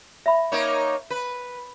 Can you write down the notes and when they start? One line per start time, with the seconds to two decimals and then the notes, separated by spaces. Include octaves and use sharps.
0.26 E5 B5
0.52 A#3 D#4 C#5
1.10 B4